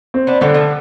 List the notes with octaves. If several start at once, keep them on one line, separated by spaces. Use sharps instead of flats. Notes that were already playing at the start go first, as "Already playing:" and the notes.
C4
B3 D4
D3 G3 B3
F3 A3